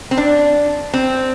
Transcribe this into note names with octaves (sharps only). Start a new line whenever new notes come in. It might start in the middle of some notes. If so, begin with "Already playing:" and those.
C4
D4
C4